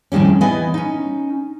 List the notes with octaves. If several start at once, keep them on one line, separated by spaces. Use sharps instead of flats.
F2 A2 D#3 G3 C#4
E3 B3 D#5 G#5
C#4 D#4